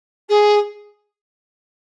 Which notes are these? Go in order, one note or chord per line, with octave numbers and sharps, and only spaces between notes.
G#4